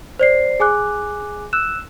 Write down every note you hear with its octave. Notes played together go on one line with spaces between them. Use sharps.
C5 D5 C7
G#4 G#5 D6 F#6
E6 F#6 E7